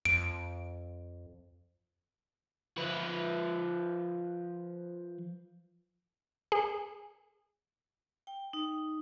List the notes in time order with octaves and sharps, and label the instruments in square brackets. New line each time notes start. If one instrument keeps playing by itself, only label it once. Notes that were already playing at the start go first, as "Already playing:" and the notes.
[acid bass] F2 [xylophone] D7
[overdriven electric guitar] F3 B4
[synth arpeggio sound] G#4
[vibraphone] G5
D#4